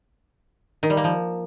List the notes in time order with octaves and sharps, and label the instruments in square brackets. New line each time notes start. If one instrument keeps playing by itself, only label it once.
[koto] D#3
G3
A#3
F3